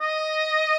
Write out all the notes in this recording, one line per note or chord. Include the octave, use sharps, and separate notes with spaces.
D#5